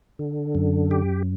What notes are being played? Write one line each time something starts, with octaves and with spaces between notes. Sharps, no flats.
D3
F#2
G4